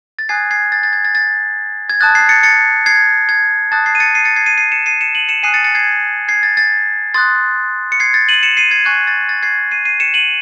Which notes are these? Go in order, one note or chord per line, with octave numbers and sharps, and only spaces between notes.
A6
G#5 D#6 F#6 G#6 C7
G#6 C7
A6
A6
G#6
A6
A6
G#6
A5 D#6 F#6 A6
G#6 C7
A6 C#7
A6 C#7
G#6 C7
G#6
A5 D#6 F#6 A6
G#6 C7
D#7
A6 C#7
C7 D#7
A6 C#7
G#6 C7
C7 D#7
C7 D#7
C#7 E7
C7 D#7
C#7 E7
D#7 F#7
C#7 E7
G#5 D#6 F#6 C7 D#7
A6 C#7
A6 C#7
G#6 C7
G#6 C7
A6
A6
C6 D#6 F#6 A6
C#7
G#6 C7
A6
D#7 F#7
C#7 E7
C7 D#7
G#6 C7
G#5 C#6 F#6 G#6
A6
A6
G#6 C7
C7 D#7
C7 D#7
C#7 E7
D#7 F#7